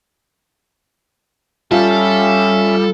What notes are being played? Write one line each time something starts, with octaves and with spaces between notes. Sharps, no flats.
G3 C#4 F4 A4 E5